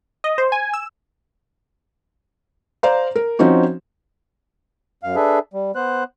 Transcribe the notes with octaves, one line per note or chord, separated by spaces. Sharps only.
D#5
C5
G#5
E6
C5 D5 F5 A#5
A#4
F3 C4 C#4 D#4 F#4
F#2 F5
D4 G#4 A4 B4 E5
G3
B3 C5 F#6